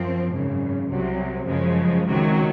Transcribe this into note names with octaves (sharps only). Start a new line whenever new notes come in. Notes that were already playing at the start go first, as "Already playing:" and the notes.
Already playing: F#2 F3 C4
G#1 F#2 C#3
C2 C3 F#3
F#2 C#3 F3 G#3
C#2 C3 D#3 F#3